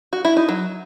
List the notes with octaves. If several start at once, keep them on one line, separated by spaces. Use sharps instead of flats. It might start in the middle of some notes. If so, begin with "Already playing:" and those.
F#4
E4
D#4
F#3